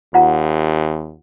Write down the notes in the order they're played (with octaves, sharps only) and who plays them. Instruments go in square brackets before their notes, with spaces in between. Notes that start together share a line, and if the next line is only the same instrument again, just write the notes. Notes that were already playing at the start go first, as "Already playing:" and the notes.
[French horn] D#2 [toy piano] F4 F#5 A#5